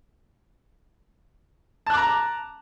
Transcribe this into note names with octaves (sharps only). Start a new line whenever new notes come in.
A5 A#5 D6 F#6